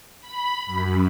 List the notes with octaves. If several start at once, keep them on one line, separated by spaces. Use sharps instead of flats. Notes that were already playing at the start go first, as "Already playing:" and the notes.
B5
F#2